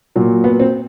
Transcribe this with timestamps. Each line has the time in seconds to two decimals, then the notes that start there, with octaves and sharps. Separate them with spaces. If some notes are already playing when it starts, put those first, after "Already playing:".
0.16 A#2 F#3
0.44 B3
0.60 C4